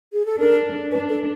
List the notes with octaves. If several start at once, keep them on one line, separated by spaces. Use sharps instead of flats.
G#4
A4
D4 A#4
D4 B4
A4